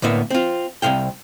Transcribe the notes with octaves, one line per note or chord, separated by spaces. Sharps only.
D2 A2 A#3 B3 E5
C4 F4
C2 F#2 C3 F5 G5